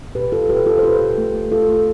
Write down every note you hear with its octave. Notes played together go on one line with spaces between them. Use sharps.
B2 G4 B4
B2 F4 A4
B2 G4 B4
B2 F4 A4
C5
B2 G4 B4
B2
A3
A3
A3 F4 A4
A3